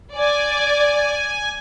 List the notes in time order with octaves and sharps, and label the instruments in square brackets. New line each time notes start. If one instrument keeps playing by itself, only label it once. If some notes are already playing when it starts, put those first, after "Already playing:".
[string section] D5 [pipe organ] G#5